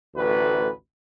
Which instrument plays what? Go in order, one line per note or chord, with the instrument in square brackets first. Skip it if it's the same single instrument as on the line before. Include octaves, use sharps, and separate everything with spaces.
[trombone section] A1 D2 B4